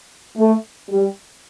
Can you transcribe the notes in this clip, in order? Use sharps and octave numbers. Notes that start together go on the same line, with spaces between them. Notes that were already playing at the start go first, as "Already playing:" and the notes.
A3
G3